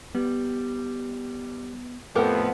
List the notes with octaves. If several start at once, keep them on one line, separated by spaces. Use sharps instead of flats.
G3 B3
F2 A2 F3 B3 G4 A4 A#4 F#5